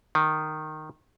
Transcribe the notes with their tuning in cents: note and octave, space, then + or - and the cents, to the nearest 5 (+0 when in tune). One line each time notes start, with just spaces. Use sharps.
D#3 -10